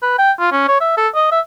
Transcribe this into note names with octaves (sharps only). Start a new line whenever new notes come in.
B4
G5
F4
C#4
C#5
E5
A4
D#5
E5